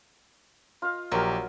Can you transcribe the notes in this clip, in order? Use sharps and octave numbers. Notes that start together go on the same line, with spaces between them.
F4 D#5 F5
A#1 F#3 G4 A#4